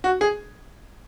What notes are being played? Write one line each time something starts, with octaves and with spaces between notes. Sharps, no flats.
F#4
G#4